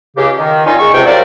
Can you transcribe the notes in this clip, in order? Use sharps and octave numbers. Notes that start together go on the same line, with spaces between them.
C#2 C#3 G4
D#3
A#2 D#3 C#4 D#4 F4
G#3 C#6
C#2 C3 G5
F#3 G3 F4 A#4 C5 D5